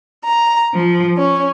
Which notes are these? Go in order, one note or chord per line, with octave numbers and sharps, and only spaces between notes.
A#5
F3
C#4